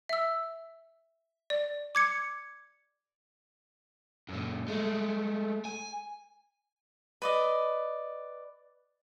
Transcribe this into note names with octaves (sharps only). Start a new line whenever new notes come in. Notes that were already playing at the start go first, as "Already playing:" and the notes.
E5 E6
D5
D6 G#6 C#7
F#2 A#2
G#3 A3
G#5
B4 D5 D#5